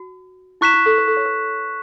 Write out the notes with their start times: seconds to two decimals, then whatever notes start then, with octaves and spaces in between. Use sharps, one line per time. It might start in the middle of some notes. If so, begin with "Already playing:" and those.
Already playing: F#4
0.61 E4 C#6 F#6 B6 E7
0.74 E4
0.86 A4
0.98 B4
1.08 A4
1.17 C#5
1.25 B4